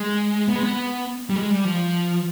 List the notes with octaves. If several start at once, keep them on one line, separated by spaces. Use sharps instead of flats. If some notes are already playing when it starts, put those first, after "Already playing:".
Already playing: G#3
B3
G#3
B3
G3
G#3
G3
F3